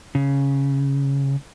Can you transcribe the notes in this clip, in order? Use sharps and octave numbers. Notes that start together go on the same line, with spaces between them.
C#3